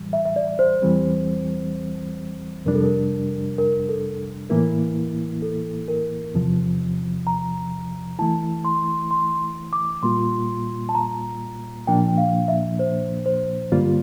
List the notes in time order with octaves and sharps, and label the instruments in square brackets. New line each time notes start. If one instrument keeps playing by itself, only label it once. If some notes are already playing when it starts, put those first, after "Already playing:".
Already playing: [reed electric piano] A2 E3 G3
[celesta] E5
E5
D5
C5
[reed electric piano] E2 E3 G3 C4
[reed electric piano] F2 C3 G3 D4 [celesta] A#4
[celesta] A4
A#4
A#4
A4
[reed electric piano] A2 E3 A#3 E4 [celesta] A#4
[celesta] A4
A#4
[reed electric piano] E2 C3 F3
[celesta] A#5
[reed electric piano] E3 A3 E4 [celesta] A5
[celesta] C6
C6
D6
[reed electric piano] A#2 G3 A#3 F4 [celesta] C6
[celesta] A5
A#5
[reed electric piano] A#2 F3 A#3 D4 [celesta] G5
[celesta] F5
E5
C5
C5
[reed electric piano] G2 D3 G3 A#3 F4 [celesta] D5